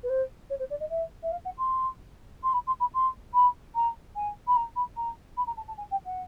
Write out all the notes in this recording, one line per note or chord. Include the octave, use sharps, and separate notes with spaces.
B4
C5
C#5
C5
D5
D#5
E5
E5
F5
F#5
C6
C6
B5
C6
B5
C6
B5
A#5
G#5
B5
A#5
B5
A#5
B5
A#5
A5
A5
G#5
G5
F#5